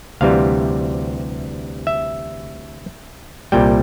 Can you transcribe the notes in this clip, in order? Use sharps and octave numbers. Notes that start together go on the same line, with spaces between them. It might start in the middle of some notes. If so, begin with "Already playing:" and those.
D2 C3 E3 G3 F5
E5
C2 A#2 G3 G5